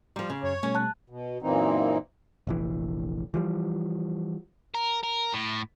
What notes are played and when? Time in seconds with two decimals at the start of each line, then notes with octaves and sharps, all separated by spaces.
0.16 F3 G3 A#5 C6 D6
0.30 C#3
0.43 F#2 C#5
0.63 B2 G3 A3 C#4
0.75 A5 F#6
1.10 B2
1.42 F#2 A#2 E3 A#3 C4 D#4
2.47 F1 A#1 E3
3.34 E3 F3 G3
4.74 A#4
5.03 A#4
5.34 A2